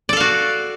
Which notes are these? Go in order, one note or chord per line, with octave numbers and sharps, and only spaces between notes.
F#4 A4 D5 F5